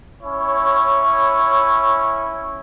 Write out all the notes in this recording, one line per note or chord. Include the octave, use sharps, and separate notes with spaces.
C#4 E4 C#5